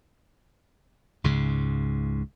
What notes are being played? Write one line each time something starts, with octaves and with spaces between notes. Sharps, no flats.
C#2 G#2 C#3